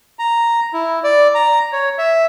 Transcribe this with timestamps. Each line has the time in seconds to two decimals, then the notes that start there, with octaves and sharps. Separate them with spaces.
0.19 A#5
0.73 E4
1.04 D5
1.35 A#5
1.73 C#5
1.98 E5